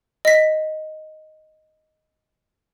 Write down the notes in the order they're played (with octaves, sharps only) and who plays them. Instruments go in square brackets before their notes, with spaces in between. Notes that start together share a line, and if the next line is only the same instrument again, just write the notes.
[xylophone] D#5 B6